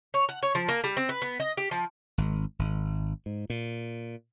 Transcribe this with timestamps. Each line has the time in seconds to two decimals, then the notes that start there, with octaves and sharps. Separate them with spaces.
0.14 C#5
0.29 F#5
0.43 C#5
0.55 F3
0.69 A#3
0.84 G3
0.97 C4
1.09 B4
1.22 B3
1.40 D#5
1.57 G4
1.71 F3
2.18 G#1
2.59 G#1
3.26 G#2
3.50 A#2